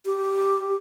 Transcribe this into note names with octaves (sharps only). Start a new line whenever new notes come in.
G4